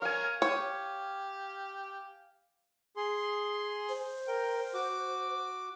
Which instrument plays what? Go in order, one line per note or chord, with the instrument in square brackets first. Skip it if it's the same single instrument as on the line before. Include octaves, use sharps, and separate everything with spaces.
[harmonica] A#4 C#5 [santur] F5 G#5
[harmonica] G4 [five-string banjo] C#5
[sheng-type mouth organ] G#4 C6
[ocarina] C5
[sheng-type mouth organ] A#4 G5
F#4 D6